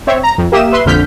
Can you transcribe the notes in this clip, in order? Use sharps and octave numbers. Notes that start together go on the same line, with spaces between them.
C4 C#5 E5
A#5
F2
A#3 G4 E5 D#6 E7
B4 E5 C6
A#1 F2 D3 F6 G6 B6